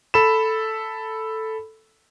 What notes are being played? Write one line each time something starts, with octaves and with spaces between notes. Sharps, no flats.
A4 B5 E7